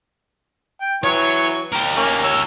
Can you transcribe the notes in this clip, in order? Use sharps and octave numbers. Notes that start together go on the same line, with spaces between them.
G5
E3 F#3 C#5 C#6
G4 A#4
A#3 C#4
C#5 E6